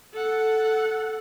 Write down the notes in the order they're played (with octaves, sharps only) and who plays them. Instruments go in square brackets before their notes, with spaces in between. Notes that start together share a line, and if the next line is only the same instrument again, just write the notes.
[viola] A4 F#5